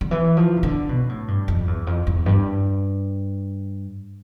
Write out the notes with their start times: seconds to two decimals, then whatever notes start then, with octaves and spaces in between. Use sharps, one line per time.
0.01 D3
0.11 E3
0.37 F3
0.57 C3
0.63 D3
0.89 B2
1.09 A2
1.28 G2
1.48 F2
1.67 E2
1.87 F2
2.07 E2
2.26 G2